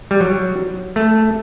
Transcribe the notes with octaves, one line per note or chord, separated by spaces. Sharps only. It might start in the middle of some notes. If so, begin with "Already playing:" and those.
G3
F#3
A3